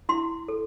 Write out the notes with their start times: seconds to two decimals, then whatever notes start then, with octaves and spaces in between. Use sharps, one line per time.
0.09 E4 C6
0.48 A4